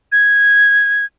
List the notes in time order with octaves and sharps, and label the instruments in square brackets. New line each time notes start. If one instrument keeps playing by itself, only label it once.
[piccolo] G#6